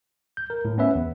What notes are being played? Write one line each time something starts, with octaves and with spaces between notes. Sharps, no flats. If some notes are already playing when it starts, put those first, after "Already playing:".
G6
A#4
A2
B3 C#4 B4 E5
E2